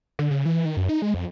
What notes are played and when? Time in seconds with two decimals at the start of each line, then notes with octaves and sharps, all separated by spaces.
0.19 D3
0.31 C#3
0.45 E3
0.65 D#3
0.77 F#2
0.89 D#4
1.02 G#3
1.14 F2